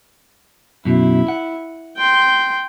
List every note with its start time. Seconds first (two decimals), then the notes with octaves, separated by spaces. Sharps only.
0.85 F#2 B2 E4
1.28 F#5
1.97 G5 C6